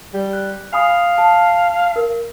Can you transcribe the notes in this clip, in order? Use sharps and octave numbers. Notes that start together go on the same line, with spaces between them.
G3
F#6
F5 G#5 B5 D#6
A5
A#4